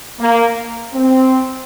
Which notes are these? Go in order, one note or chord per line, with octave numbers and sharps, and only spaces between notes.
A#3
C4